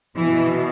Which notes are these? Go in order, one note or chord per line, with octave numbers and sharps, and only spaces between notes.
B2 E3